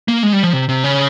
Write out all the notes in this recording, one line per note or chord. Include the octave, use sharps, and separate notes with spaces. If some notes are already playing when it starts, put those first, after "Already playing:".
A#3
G#3
G3
F3
C3
C3
C#3